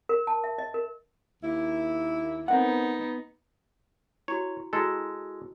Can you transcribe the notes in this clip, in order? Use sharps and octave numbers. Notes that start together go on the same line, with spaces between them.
A#4
A5
E5
D#5
A#4
D#2 A#3 E4
B3 C4 D#4 A#4 F#5
E4 F#4 C#5
G#3 E4 F#4 A4